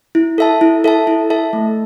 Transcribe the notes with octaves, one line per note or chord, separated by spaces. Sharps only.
E4
A4 E5 A5
E4
A4 E5 A5
E4
A4 E5 A5
A3